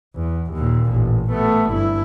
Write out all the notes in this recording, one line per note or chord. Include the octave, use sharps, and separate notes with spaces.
E2
D#2 A#2
A1
A3 B3
G1 E4